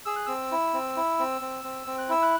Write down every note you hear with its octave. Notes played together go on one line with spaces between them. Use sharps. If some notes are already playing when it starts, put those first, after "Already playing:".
G#4 E6
F#6
C4 E6
E4
C4
E4
C4
C4
C4
C4
F#6
E4 E6
F#6